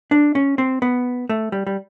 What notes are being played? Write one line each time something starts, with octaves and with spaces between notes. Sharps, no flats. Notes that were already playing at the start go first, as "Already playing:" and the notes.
D4
C#4
C4
B3
A3
G3
G3